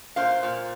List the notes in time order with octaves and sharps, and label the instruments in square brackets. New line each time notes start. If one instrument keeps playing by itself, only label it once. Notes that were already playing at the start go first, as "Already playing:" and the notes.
[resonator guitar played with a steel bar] A#2 C5 F5
A#2